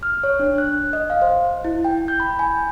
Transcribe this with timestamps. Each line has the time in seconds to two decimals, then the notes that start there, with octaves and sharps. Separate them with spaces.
0.03 F6
0.24 C#5
0.39 D4
0.58 F#6
0.93 D#5
1.10 F5
1.22 C5
1.64 E4
1.85 G5
2.08 G6
2.20 B5
2.39 G#5